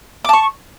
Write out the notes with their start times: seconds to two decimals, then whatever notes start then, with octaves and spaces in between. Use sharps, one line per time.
0.25 D6
0.29 A5
0.33 C#6